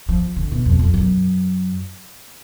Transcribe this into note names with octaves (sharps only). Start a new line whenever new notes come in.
F3
D3
B2
F2
F2
F#2